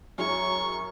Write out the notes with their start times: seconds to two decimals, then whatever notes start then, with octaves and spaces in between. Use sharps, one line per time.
0.18 F#2 G#3 E4 A#4 C#5 C#6